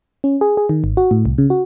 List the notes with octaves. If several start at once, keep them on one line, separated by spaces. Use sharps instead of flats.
C#4
G#4
G#4
D#3
G#1
F#4
A2
C2
C#3
F#4